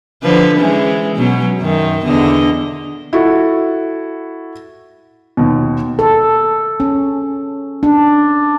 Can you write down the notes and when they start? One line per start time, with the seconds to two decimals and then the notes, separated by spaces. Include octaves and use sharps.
0.23 D3 F3 B4
0.58 E3 G#3 C#4
1.16 B2 F#3 C#4
1.60 F#2 D#3
2.05 E2 D3 D#5
3.13 E4 F#4 A4
5.37 D#2 B2
5.99 A4
6.80 C#4
7.83 D4